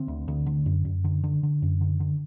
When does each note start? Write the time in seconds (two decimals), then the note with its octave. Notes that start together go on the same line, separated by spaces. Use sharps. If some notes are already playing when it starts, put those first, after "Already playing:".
Already playing: D3 C4
0.08 D2
0.28 D2
0.46 D3
0.66 F#2
0.85 F#2
1.04 D3
1.24 D3
1.43 D3
1.62 F#2
1.81 D3
2.00 D3